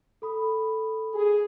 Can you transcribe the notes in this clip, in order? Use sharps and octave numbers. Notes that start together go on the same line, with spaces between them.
A4 B5 D#6
G#4